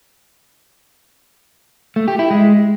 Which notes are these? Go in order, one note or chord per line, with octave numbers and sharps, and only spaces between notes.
A3
G4
E4
G#3